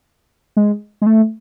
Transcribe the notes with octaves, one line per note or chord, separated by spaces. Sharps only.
G#3
G#3
A3